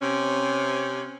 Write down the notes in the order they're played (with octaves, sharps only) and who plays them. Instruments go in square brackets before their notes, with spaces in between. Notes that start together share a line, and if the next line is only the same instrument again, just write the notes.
[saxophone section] C3 C#4